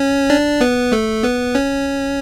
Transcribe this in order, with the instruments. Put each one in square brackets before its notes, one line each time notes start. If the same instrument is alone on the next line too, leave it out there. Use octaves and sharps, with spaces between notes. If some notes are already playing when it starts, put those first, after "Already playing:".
Already playing: [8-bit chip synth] C#4 C#5
D4 D5
B3 B4
A3 A4
B3 B4
C#4 C#5